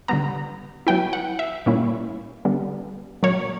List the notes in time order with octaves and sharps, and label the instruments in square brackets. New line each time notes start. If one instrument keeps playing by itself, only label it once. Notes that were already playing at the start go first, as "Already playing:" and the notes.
[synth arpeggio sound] D3 G3 B3 A#5
F#3 B3 E4 G5
F#5
E5
A#2 G3 A#3 C#4 E4
D3 G3 B3
A#2 F#3 A#3 C#5